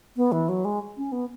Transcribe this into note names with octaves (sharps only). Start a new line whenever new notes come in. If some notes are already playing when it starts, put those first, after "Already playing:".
B3
E3
F#3
G#3
C#4
B3